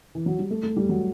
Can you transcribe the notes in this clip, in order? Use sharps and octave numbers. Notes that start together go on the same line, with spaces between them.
E3
F#3
G3
A3
A3
G3
F#3